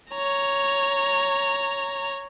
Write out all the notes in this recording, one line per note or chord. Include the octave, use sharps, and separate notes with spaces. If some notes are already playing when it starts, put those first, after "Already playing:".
C#5 A#5